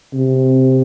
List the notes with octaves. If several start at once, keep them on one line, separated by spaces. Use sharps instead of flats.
C3